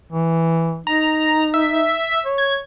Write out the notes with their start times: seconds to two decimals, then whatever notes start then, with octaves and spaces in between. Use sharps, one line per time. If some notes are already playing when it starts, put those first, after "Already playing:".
0.13 E3
0.87 D#4 A#5
1.54 E5
2.25 C#5
2.38 G#6